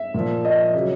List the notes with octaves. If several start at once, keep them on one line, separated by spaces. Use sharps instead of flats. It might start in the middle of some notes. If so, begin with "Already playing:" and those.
Already playing: E5
A#2 F3
D#5
C#3 F#3